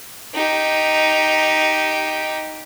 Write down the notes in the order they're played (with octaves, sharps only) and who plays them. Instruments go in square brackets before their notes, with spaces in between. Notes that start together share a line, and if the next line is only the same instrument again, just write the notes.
[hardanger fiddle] D#4 G4